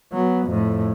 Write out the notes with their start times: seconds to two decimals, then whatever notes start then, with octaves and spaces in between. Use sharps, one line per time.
0.12 F#3 B3
0.47 F2 A2